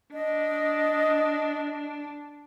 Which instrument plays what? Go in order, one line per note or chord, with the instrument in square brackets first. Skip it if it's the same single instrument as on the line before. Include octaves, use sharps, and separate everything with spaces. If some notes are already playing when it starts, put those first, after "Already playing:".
[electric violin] D4 [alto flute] D#5